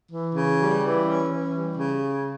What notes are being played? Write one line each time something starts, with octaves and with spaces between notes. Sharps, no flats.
E3
C#3
G3
E3
C#4
E3
G3
C#3